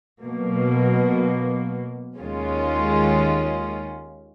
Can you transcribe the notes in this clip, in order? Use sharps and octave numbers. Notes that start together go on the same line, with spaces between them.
B2 F#3 A#3
D#2 D#3 G#3 C#4 F4